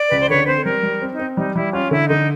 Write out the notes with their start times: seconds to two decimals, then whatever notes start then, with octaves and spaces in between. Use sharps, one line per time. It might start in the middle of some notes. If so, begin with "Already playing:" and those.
Already playing: D5
0.08 C#2 B4
0.19 C5
0.29 D3 B4 C#5
0.44 B4
0.47 C4 C5
0.65 G3 A#4
0.83 G3
1.02 C4
1.13 D#4
1.19 C4
1.37 G3 D#4
1.55 G3 E4
1.67 F#4
1.73 C#4 F4
1.91 D3 E4
2.09 D3 D#4